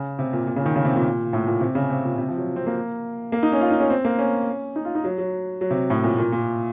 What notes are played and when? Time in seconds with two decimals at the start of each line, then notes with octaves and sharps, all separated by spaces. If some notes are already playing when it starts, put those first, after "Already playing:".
Already playing: C#3
0.19 C3
0.33 A#2
0.47 A#2
0.56 C#3
0.66 D#3
0.76 C#3
0.85 C3
0.95 A#2
1.33 A2
1.47 A#2
1.61 C3
1.75 C#3
1.90 C3
2.05 A#2
2.18 C3
2.29 F3
2.38 F#3
2.56 C4
2.66 A#3
3.32 A#3
3.43 D#4
3.52 C#4
3.61 F4
3.71 D#4
3.80 C#4
3.90 C4
4.05 A#3
4.18 C#4
4.76 D#4
4.85 F4
4.95 D#4
5.04 F#3
5.18 F#3
5.61 F#3
5.70 C3
5.90 A2
6.04 A#2
6.18 A#2
6.32 A#2